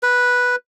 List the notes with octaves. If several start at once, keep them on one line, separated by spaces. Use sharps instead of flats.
B4